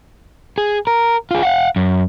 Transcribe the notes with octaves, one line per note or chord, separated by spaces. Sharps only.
G#4
A#4
F4 G#4
F5 F#5
F#2